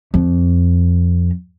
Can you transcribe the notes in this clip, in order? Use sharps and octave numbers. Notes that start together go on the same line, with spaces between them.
F2